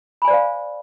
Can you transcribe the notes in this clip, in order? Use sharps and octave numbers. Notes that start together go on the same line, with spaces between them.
C5 D5 F5 G#5 B5